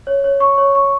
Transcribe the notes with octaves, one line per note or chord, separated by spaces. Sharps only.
C#5
C#5
C#6
C#5
C#6